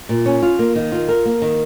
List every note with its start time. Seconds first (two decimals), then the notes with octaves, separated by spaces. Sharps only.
0.09 A#2
0.26 C#4
0.43 F4
0.59 A#3
0.76 D#3
0.92 F4
1.09 A#4
1.26 A#3
1.42 D#3